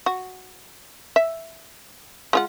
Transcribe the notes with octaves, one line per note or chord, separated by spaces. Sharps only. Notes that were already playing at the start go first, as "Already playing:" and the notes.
F#4
E5
G#3 F4 F#5